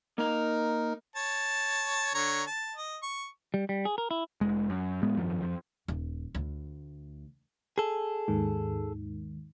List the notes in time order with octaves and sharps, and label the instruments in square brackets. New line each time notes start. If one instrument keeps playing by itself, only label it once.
[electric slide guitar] A#3 A#5 [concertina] D#4 A#4
[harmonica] C#5 A5
D3 C#5 A#5
A5
D#5
C#6
[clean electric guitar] G3
G3
G#4
A#4
E4
[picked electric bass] F1 G#3
F#2
A2 G#3 B3
G#1 F#2 F3
F2 F3
[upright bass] D#1
D2
[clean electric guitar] G#4 A4
[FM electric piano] D#2 G#2 D#3